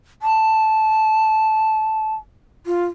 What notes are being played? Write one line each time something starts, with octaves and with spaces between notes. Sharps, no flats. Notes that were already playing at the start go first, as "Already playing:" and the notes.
A5
F4